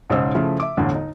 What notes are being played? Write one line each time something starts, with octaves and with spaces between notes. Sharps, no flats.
B1 G#2 C#3 D#4 C5 E6
C#3 F3 A3 E4
E5 D6
G1 E2 A2 D3
D#4